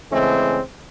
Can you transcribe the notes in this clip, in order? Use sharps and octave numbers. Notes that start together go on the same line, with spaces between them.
C#3 E3 G#3 A3 C4